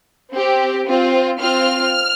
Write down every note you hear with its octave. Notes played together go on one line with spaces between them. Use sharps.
C4 G4
C4 F4
C4 F4 F6